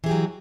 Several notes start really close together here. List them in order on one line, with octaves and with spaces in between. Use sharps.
E3 G#4 G4 F#3